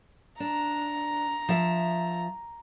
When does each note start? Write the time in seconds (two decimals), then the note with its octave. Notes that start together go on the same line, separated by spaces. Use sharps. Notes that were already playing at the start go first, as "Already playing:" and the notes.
0.40 D4 A#5
1.49 F3 E5